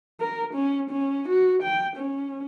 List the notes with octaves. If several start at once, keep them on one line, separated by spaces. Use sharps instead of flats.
A#4
C#4
C#4
F#4
G5
C#4